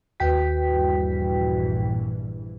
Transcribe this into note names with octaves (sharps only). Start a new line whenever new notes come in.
D#2 F#4 B4 G5 B6
A#1 G2 E3